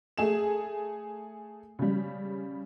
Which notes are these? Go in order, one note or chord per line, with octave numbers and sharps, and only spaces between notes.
A3 G#4 E7
C#3 G3